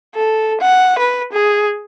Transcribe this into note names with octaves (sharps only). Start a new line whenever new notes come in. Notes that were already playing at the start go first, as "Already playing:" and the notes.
A4
F#5
B4
G#4